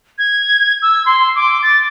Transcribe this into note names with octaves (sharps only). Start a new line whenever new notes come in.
G#6
E6
C6
D6
A6